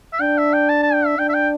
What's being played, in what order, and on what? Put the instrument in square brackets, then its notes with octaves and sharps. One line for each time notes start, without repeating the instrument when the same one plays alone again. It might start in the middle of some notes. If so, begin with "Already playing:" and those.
[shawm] E5
[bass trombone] D4 [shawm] G5
[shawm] E5
G5
A5
A5
G5
E5
[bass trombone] D4 [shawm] G5
[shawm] E5
G5